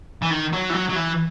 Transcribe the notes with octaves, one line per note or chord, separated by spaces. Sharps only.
E3
D#3
F#3
E3
F#3
F#3
E3